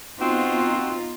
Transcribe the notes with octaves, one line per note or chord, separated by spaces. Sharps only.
B3 C4 D#4 F4 F#4